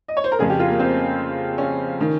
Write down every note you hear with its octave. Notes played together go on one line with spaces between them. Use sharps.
D#5
C#5
C5
A#4
F2 C#3 G#4
G4
F4
A#3
C4
C#4
D#3